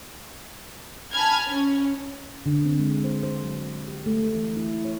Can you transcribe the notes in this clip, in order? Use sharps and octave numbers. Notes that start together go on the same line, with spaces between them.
G#5 A5 B5 F6 G#6
C#4
D3
C4
G#3
C5
C5
F#3
G4
A3
E3
E4
C#5